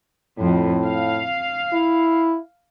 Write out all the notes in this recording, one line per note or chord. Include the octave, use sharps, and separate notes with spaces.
F2 A2
F5
E4